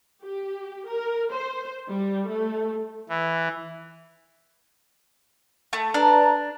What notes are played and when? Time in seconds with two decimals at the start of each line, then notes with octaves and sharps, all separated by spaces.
0.22 G4
0.88 A#4
1.32 C5
1.89 G3
2.28 A3
3.09 E3
5.73 A3
5.94 D4 B4 D5 A#5